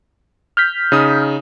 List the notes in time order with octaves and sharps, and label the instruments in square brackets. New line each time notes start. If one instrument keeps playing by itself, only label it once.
[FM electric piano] F6 G6 B6
[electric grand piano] C#3 D#4 D#6